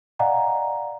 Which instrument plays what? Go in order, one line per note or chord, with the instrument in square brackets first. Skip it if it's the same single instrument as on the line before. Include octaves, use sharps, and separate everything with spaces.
[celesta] D5 D#5 F5 F#5 G#5 A#5